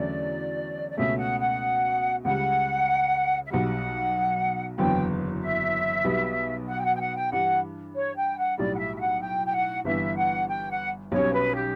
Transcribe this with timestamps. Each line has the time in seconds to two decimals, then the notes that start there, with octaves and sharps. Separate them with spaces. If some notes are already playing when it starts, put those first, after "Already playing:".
Already playing: E2 D3 F#3 A3 C#4 D5
0.91 D5
0.97 C#2 B2 A3 C#4 E5
1.18 F#5
1.40 F#5
2.24 C#2 C#3 G3 F#5
3.45 E5
3.50 B1 B2 G3 F#5
4.78 F#1 E2 D3 F#3 B3 G5
5.41 E5
6.04 B1 B2 G3 B3
6.68 F#5
6.79 G5
6.84 F#5
6.95 G5
7.00 F#5
7.16 G5
7.31 G2 E3 G3 D4 F#5
7.95 C#5
8.17 G5
8.37 F#5
8.58 B1 A2 G3 D5
8.75 F#5
8.79 E5
8.95 E5
9.00 F#5
9.22 G5
9.45 G5
9.53 F#5
9.85 G1 G2 E3 B3 E5
10.17 F#5
10.49 G5
10.70 F#5
11.12 B1 B2 G3 C#4 C#5
11.34 B4
11.54 G4